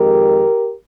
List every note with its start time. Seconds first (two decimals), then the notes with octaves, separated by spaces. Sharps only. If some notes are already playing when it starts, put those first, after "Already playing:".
Already playing: F2 D#3 G#3 G4 A#4